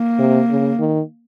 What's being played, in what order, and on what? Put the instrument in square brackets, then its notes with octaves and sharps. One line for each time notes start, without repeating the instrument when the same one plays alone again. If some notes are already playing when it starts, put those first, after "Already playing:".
Already playing: [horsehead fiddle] A#3
[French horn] C3
C#3
D#3